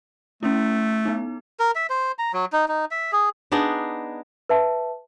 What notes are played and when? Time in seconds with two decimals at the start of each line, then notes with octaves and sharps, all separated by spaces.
0.43 A3 C#4 E4
1.05 B3 D#4
1.60 A#4
1.75 E5
1.90 C5
2.19 A#5
2.33 F#3
2.53 D#4
2.68 D#4
2.91 E5
3.12 G#4
3.52 B3 D4 D#4 G#4
4.49 B4 E5 A5